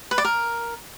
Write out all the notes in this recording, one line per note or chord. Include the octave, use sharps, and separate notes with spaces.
B4
D5
A#4